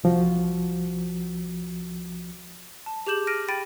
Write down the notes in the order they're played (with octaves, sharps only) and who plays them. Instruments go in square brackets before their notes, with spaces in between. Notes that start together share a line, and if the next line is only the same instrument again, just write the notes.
[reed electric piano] C2 F3 F#4
[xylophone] A5
G4 G#4 D6 G6 E7 F#7
F6 A#6 D7 D#7
G5 B5 A6 D7 D#7